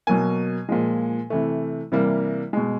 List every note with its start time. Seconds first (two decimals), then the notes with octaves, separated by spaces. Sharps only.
0.07 B2 F#3 A#3 G#5
0.69 A#2 F3 G#3
1.30 C3 E3 A3
1.92 C3 E3 G3 A#3
2.53 B2 G#3